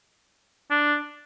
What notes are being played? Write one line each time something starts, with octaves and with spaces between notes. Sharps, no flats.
D4